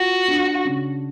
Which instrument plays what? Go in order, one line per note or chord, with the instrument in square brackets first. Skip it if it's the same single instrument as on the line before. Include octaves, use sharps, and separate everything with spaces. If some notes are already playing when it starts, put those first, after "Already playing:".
Already playing: [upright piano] F4 [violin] F#4
[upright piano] D4
C#3